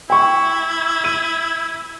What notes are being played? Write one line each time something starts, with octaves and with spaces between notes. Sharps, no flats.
E4 G5 C#6
D#7